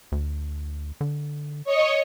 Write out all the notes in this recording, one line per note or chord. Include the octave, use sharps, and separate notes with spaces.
D2
D3
C#5 D#5 C#7